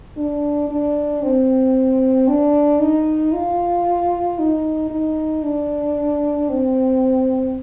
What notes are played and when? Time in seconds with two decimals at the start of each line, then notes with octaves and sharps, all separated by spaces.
0.17 D4
0.69 D4
1.22 C4
2.28 D4
2.80 D#4
3.33 F4
4.39 D#4
4.90 D#4
5.43 D4
6.49 C4